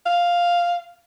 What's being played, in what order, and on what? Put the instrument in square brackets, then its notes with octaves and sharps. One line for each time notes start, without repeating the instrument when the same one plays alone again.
[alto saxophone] F5